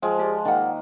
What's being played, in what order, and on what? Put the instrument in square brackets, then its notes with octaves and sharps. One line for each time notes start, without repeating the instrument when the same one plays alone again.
[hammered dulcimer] F3 G#3 [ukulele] G5
[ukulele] G4 G#4 D5
[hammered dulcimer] D#3 A#3 [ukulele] D5 F#5